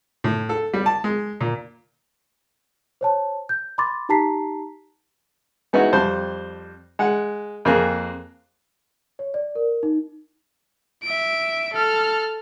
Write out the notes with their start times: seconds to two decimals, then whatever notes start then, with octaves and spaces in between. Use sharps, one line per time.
0.24 A2
0.49 A4
0.74 G3
0.86 A5
1.04 G#3
1.41 A#2
3.01 C5 C#5 A5
3.49 G6
3.78 B5 C6 D6 A6
4.09 D#4 G4 A5 A#5 B6 C7
5.73 G#3 B3 D#4 E4 F#4
5.93 F2 G3 C5 A5
6.99 G#3 F#5
7.65 F2 A#3 G#4 F#6
9.19 C#5
9.34 D5
9.55 A#4
9.83 D#4
11.04 E5 D7
11.73 A4 F6